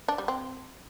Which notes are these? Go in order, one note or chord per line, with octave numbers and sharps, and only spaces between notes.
D4
G3
C4